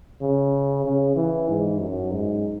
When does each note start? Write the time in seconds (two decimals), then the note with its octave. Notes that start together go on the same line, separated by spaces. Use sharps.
0.21 C#3
0.85 C#3
1.16 E3
1.48 G#2
1.80 F#2
2.12 G#2